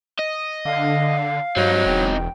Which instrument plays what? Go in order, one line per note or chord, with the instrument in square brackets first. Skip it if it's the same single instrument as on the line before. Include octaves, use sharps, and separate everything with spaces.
[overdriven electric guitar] D#5
[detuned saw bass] D3 [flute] F5
[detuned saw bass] G2 [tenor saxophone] F#3 [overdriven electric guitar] C4 D#4
[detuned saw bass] E1 [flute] G5